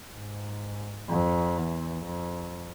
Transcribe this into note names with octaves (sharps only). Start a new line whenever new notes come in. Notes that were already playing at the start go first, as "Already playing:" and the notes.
G#2
F2
E2
F2